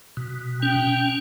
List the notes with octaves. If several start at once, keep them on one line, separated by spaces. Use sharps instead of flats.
B2
C#4 G5